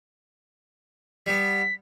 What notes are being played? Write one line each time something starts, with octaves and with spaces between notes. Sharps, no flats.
G3 B3 B6